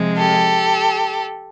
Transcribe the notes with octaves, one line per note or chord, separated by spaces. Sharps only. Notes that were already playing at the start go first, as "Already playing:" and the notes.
Already playing: C3 F3 G#3
G4 A4